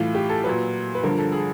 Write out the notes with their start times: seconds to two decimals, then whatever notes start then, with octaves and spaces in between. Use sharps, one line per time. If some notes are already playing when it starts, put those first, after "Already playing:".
Already playing: A2 E3 F4
0.15 G4
0.30 A4
0.44 A#2 F#3 B4
0.95 B4
1.03 G2 D3 F3 A#4
1.18 A4
1.32 G#4